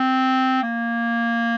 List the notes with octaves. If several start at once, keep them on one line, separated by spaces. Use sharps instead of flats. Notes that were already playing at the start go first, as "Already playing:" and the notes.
Already playing: C4
A#3